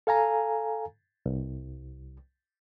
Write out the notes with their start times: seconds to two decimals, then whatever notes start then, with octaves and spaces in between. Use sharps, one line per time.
0.07 A4 F5 G#5 A#5
1.26 C2